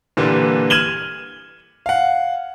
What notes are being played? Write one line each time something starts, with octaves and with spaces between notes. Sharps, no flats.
A#2 D3 E3 G3
F6 G#6 D#7 E7 F#7 G7
F5 F#5